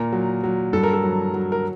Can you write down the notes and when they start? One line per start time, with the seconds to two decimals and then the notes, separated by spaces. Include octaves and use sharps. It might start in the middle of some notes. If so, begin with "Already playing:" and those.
Already playing: A#2 A#4
0.12 F#3
0.44 F#3
0.73 G2 A4
0.83 A#4
0.93 A4
1.04 F#3
1.34 F#3
1.52 A#4